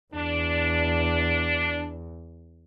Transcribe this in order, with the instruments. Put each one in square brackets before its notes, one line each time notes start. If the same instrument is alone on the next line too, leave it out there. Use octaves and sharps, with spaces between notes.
[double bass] E2 [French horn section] D4